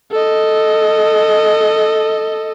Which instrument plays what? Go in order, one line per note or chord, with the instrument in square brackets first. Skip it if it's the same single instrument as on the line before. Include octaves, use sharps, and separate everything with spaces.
[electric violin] A4 D#5